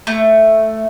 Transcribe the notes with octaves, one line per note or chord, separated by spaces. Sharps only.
A3